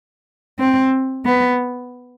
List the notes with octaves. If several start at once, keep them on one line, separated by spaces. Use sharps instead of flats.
C4
B3